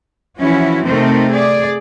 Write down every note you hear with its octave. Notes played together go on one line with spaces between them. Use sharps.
E3 F3 C#4 E4 F#4
C3 A3 C4 D#4 A#4
G#4 D5